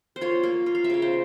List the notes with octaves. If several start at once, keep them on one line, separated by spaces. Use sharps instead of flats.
C5
F4 C#5
A#3
F4
F5
E5
C#3 C#5
C5